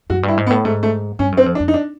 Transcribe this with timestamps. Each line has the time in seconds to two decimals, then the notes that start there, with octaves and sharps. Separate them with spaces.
0.10 F#2 F#4
0.23 G2
0.28 E4
0.37 G#2
0.47 B3
0.50 A2
0.65 G#2 A3
0.83 A3
1.19 G2 C#4
1.32 F#2
1.37 C4
1.46 F2
1.55 D4
1.60 F2
1.68 D#4
1.74 D4